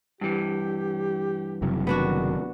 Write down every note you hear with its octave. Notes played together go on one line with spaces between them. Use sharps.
G2 E3 G4
F#1 C3 F#3
D#3 B3 D4 F#4